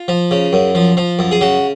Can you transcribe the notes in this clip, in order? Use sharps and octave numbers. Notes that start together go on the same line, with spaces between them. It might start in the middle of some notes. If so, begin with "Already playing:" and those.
Already playing: F4
F3
C#3
F#2
F3
F3
F#2
G#4
C#3 F#4